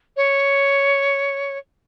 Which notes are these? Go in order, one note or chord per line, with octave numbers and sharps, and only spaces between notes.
C#5